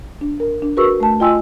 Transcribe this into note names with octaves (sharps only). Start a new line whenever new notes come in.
D4
A#4
D4
F#4 G#4 A#4 B4 C#6 E6
A3 A5
F4 D#5 G5 G#5 C6 E6